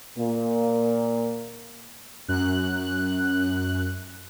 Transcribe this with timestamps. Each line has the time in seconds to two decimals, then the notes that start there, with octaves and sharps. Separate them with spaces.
0.18 A#2 A#3
2.28 F#2 F#6